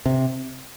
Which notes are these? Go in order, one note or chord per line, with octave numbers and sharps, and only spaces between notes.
C3